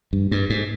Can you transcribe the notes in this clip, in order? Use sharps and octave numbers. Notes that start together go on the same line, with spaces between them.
G2
G2
G#2